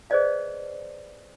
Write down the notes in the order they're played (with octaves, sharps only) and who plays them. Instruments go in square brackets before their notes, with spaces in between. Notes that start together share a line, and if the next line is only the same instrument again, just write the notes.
[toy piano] G#4 B4 C5 D5 D#5 F5